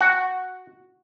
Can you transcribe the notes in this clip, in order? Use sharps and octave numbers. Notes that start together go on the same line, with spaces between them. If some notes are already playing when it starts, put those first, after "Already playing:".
F#4 F#5